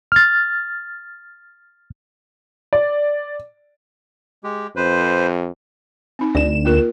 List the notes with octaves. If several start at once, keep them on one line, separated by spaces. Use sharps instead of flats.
F6 A6
D5
G#3 G4
F2 B4 C5
C4 D#4
D2 D5 E7
A#3 F4 A#4